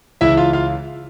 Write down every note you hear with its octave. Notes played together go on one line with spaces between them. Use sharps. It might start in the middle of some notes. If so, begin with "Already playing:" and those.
C#2 C#3 E3 E4 E5
F4 F5
F4 F5